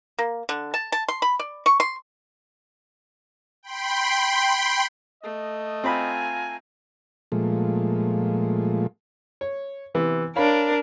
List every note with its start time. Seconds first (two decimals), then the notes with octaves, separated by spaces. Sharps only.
0.19 A#3
0.49 D3
0.74 A5
0.92 A5
1.09 C6
1.22 B5
1.39 D5
1.66 C#6
1.80 C6
3.63 G5 B5 C6
5.24 A3 D#5
5.84 C4 F4 G#5 A#5 B5
7.32 A#2 F3 G#3 A3
9.41 C#5
9.94 C3 E3 B3
10.36 D4 A#4 C#5 F5 B5